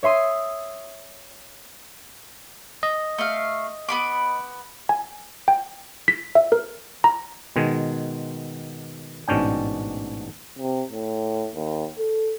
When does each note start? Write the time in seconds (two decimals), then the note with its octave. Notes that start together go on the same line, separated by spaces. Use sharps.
0.03 C#5 E5 C6 D#6
2.83 D#5
3.18 A3 F5
3.89 B3 B5 D6
4.89 G#5
5.48 G5
6.08 B6
6.35 E5
6.52 A#4
7.04 A#5
7.56 B2 D#3 G#3 G#4
9.28 A1 G#2 B2 C#4 D4 G5
10.59 C3
10.92 A2
11.54 D#2
11.99 A4